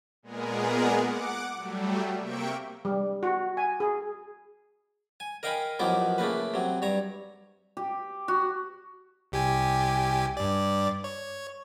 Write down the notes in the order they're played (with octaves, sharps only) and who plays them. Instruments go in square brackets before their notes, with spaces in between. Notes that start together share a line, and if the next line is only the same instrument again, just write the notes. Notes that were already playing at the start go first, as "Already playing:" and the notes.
[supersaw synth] A#2 G#3 B3 G#4 A#4
F#5 D6
F#3 G3 A3
C3 A#3 E5 G5 C#6 D7
[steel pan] G3
F#4
G#5
G#4
[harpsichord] G#5
A#4 D#5 F5 G5 G#5 B5
A1 D#3 F3 F#3 B3 D6
C#3 A3 A#3 B4
C3 F#3
G2 C#5 A#5
[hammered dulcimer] G4
F#4
[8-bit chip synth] C2 G4 G#5
G2 D5
C#5